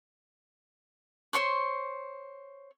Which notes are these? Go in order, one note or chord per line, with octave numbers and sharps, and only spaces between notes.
C5 C#5 C6 C#6